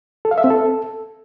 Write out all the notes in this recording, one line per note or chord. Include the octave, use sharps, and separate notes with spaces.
A4
F5
E5
C4
A4